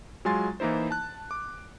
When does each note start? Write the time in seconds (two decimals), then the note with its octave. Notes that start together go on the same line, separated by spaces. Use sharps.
0.25 F#3 G#3 F4 G#5 C6 A6
0.60 E3 A#3 D#4 E4 C5
0.91 A5 F#6
1.31 D6